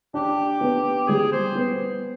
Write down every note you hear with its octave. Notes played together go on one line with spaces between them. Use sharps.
D4 G4
B3
G3 G#4
C5
B3